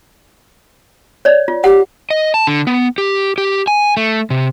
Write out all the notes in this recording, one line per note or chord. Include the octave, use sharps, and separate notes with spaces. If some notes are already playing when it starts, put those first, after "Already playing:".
C#5 D5
F4
G4 F#5
D#5
A5
D3
B3
G4
G4
G#5
A3
C3